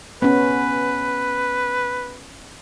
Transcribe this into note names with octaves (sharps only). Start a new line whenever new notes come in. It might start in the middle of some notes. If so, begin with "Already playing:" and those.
B3 C#4 B4